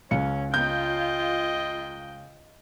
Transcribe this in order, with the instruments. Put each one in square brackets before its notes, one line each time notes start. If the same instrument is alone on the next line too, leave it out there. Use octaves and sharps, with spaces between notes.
[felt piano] C#2 C#7 [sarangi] C#4
[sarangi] F4 [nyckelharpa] D#5 G5 [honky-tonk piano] G6